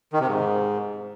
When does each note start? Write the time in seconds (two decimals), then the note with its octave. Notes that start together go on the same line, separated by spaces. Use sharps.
0.13 D#3
0.20 C3
0.27 G#2